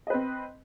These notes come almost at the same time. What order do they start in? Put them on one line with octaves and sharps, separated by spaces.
D#5 B4 C4